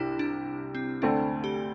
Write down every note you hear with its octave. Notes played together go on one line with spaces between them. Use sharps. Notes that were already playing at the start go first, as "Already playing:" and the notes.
Already playing: C2 C3 D4 E4
D4
C4
D2 D3 A3 C4 D4
G4